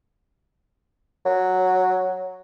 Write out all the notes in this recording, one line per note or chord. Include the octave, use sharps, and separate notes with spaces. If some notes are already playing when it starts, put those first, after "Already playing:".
F#3